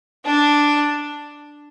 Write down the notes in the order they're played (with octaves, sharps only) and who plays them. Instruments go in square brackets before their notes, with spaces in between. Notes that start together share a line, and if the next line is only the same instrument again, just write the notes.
[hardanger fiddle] D4